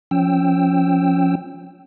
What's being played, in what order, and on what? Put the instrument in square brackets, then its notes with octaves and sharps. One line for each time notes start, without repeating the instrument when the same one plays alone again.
[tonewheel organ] F3 C#4 G5 E6